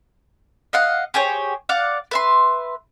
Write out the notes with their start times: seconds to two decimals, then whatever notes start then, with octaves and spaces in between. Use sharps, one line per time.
0.73 D#5 F5 F#5
1.14 G4 G#4 C5 C#5
1.69 D5 F5 F#5 D6
2.11 B4 E5 C6